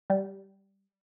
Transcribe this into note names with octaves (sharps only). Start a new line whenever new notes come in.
G3